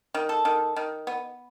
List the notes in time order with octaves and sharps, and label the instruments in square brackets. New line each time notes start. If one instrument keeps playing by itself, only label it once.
[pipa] D#3
A4
D#3
D#3
B3